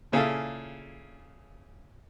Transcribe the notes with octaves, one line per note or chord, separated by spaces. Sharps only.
A#2 C#3 E4 F4 G#4 A4